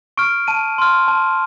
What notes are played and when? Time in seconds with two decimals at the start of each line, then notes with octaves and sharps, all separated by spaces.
0.17 C#6 F6 D7
0.47 A5 D#7
0.78 C6 F6
1.08 A5